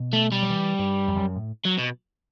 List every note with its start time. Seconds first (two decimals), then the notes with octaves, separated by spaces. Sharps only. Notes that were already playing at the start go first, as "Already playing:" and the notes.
Already playing: B2
0.13 A3
0.32 G3
0.42 F#3
0.50 E3
0.79 G2
1.08 F#2
1.16 E2
1.21 F#2
1.36 A2
1.65 F#3
1.79 B2